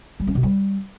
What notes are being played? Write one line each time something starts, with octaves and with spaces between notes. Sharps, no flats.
G3
C#4
B2
G3